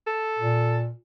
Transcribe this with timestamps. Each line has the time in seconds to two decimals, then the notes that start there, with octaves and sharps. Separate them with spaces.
0.06 A4
0.39 A#2